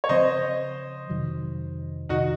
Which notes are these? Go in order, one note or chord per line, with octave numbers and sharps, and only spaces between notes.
C#5
C#3 F3 C4 C5 D#5
F2 C3 D#3 F#3
F2 C3 D#3 D#4 F#4